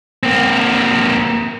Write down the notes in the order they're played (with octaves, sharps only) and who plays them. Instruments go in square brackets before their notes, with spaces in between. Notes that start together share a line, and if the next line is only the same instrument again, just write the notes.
[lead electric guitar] A#3 C4